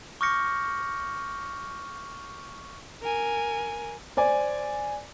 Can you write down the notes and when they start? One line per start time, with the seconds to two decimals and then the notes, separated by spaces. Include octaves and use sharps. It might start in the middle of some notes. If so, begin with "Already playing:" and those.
0.21 C#6 D6 F6 G6 A#6 C#7
3.03 A#4 G#5
4.17 C5 D5 G#5